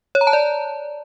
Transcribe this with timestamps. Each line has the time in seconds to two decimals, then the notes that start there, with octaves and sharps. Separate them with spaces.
0.15 C#5
0.21 A#5
0.27 A5
0.33 D5